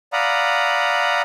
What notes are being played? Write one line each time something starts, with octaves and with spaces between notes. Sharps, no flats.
D5 F5 F#5 A#5 B5 D#6